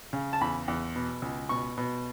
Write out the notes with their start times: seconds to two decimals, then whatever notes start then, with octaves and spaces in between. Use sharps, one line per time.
0.13 C#3
0.33 A5
0.41 E2 B5
0.68 E2
0.96 B2
1.22 C#2
1.49 B2 C#6
1.78 B2